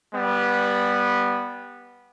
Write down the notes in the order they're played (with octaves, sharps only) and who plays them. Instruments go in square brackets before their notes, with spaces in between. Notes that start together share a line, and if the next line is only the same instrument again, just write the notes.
[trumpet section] G3 B3